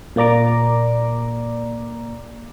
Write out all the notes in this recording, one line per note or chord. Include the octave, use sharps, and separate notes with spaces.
A#2 A#3 D5 A#5 D6